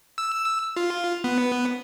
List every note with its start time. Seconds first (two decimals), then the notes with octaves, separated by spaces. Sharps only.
0.18 E6
0.76 F4
1.24 B3